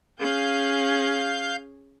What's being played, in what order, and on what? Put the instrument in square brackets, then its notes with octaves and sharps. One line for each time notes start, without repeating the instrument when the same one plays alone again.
[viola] C#4 G#4 [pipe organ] F5 G6